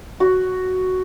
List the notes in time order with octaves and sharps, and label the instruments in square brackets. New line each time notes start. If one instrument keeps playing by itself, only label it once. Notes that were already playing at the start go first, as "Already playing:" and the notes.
[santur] F#4